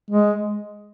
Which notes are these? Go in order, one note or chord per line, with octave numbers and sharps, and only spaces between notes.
G#3